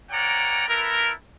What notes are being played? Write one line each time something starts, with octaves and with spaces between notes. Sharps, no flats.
A#3 C#5 D5 F#5 G5 A#5
B3 E4 A4 A#4